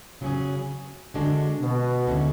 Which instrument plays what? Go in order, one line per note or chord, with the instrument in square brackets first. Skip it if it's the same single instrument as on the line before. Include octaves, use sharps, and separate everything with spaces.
[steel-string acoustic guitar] C#3 F#3 C#4 G#4
D3 G#3 D4 F#4
[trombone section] B2
[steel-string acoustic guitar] D2 D3 G#3 C#4 E4